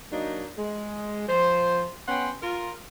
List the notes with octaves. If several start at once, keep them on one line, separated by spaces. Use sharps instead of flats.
F#3 A#3 D4 D#4
G#3
F3 C5
B3 C#4 F#5 G5 C6
F4 A#4